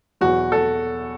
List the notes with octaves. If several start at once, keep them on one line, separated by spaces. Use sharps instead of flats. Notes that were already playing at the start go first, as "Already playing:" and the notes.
E2 B2 F#3 F#4
A4